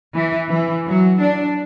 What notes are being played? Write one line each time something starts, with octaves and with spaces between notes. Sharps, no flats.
E3
E3
F#3
D4